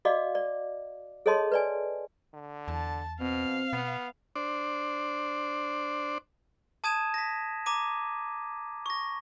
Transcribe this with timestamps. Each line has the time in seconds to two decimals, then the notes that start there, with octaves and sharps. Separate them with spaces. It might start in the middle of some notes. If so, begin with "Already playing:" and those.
0.05 F#4 D5 D#5 F5 D6
0.35 D5
1.26 G#4 A4 C#5 D#5 A5 C6
1.52 B4 D5 G#5
2.34 D3
2.68 E2 A5
3.20 B2 C4 F5
3.73 B2 B3
4.36 D4 C5 D5
6.84 A5 D#6 G#6 D#7 E7
7.14 A#6 B6
7.66 A#5 D6 D#7
8.86 C#6 A#6